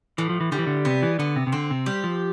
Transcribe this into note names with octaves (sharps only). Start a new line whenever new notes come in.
A2 E3
F3
E3
D3 G3
E3
D3
C3 B3
E3
D3 B3
C3
C3
D3 C4
C3
G3 G4
F3